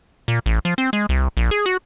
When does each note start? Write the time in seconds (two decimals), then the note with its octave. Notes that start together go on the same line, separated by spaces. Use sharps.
0.28 A#2
0.46 A1
0.65 F3
0.78 C4
0.93 G#3
1.09 C2
1.37 A#1
1.51 G#4
1.66 F#4